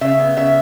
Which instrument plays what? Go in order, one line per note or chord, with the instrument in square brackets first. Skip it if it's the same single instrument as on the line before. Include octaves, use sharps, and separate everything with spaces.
[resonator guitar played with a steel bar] C#3 E5
B3
C#3 E5